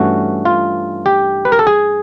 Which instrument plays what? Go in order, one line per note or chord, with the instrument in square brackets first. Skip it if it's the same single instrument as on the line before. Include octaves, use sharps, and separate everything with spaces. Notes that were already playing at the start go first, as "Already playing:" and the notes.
Already playing: [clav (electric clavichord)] G2 E3 A3 C#4 F#4
F4
G4
B4
A#4
A4
G#4